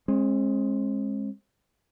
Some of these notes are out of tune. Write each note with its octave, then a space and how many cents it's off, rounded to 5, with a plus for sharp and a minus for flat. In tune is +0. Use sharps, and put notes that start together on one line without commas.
G#3 +5 C4 +45